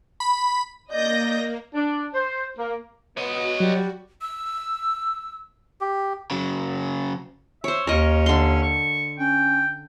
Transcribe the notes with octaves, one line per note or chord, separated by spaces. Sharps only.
B5
A#3 D5 D#5 G6 A#6
D4
C5
A#3
B3 F#4 C#5 D#5
F#3 G3
E6
G4
C#3 F#3
C5 C#5 E5
D#2 C#4 A#4 D#5
D3 C6
C#6
C#4 G5